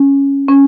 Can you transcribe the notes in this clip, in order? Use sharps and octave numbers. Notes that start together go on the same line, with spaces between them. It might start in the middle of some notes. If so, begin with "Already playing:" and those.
Already playing: C#4
C#4